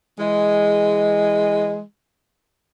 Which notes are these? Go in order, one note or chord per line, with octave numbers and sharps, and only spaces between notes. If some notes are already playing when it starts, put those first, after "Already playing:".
E3 G#3